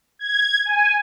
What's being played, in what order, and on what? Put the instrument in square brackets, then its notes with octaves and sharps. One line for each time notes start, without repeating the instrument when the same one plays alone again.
[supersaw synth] G#6
G#5